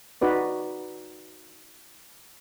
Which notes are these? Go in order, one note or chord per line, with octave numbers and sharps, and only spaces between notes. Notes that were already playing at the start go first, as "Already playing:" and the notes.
D#4 F#4 B4 D5